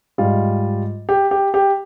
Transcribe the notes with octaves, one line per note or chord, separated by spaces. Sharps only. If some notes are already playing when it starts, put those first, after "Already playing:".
G#2 G3 F4
G4
G4
G4